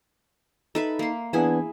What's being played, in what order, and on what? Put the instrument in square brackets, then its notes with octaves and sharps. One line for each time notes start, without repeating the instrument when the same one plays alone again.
[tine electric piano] D#4 [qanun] A4 B4 E5
[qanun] A#3 C6
[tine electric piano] E3 B3 D4 [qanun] E4 G#4 E5